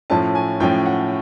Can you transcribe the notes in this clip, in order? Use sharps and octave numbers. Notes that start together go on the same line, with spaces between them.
A2 F3 A3 C#4 A5
G#5
A2 F3 A3 C#4 G5
F#5